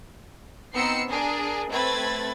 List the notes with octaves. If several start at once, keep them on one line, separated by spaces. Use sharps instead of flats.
B3 C4 D#4 E6 C7 C#7
D4 G#4 A#4
A3 C4 B4 B5 G#6 A6